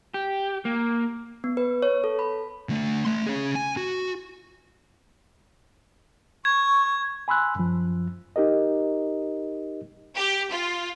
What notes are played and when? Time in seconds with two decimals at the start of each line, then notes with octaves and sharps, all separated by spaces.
0.14 G4
0.65 A#3
1.44 B3
1.57 B4
1.82 C#5
2.04 A4
2.19 B5
2.69 D3 A3
3.05 A3 C6
3.26 C#4 G#4
3.55 G#5
3.77 F#4
6.45 C#6 G#6
7.28 G#5 B5 C6 E6 F#6
7.56 F#2 F3
8.36 D#4 G4 A#4 D#5
10.16 G4
10.50 F4